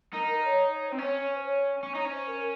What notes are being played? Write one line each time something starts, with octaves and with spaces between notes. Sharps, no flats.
D#4 A#4
C#5
C#5
C5
C4
C#4 C#5
C5
C#5
C#4 C#5
D#4
C#4 C5
A#4